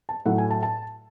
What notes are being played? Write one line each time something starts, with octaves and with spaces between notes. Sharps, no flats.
A5
A2 F#3 A3 F#5
G#5
A5
A5